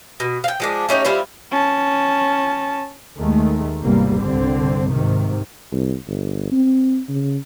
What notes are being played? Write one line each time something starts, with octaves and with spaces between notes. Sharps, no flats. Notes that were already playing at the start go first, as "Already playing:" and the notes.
B2
F5 G5
F3 G#3 D4
A3 C#4 D#4 G4
G3 C4 E4 F4
C#4 A5
D#2 D#3 G#3 A3
G#1 E2 C3 G3 A#3
C2 G2 D3 C4
G#2 C3 D#3
C2
G1
C4
C#3